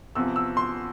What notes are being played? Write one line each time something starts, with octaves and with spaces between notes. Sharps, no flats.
E2 C3 F3 E6
E6
C6